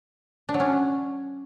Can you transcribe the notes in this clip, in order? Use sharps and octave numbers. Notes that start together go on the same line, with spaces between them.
D4
F#3
C#4